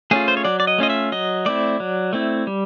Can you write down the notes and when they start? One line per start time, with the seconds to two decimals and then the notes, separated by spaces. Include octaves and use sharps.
0.11 A3 C#4 F4 G#4
0.28 C5
0.37 C#5
0.45 F#3 D5
0.60 D5
0.67 D#5
0.78 A3 C#4 F4 D#5
0.90 E5
1.12 F#3 D#5
1.46 A3 C4 E4 D5
1.80 F#3
2.13 A3 C4 E4
2.47 G3